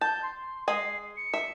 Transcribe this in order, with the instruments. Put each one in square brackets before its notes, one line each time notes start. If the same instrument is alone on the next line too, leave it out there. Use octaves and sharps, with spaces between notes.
[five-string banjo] A5 [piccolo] G6
[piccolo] C6
[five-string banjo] G#3 G#5 [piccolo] C7
[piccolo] C#7
[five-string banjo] E5